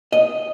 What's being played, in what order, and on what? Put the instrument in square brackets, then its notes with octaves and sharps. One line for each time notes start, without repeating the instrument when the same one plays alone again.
[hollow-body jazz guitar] D#5